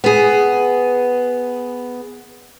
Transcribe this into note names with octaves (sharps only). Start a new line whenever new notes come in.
B3 G#4